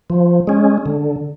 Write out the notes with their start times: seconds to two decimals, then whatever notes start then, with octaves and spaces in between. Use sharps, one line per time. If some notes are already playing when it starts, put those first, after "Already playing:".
0.10 F3
0.47 G#3 C#4
0.86 D3